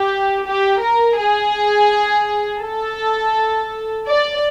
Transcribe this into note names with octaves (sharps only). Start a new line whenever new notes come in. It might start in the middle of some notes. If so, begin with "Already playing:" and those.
Already playing: G4
G4
A#4
G#4
A4
D5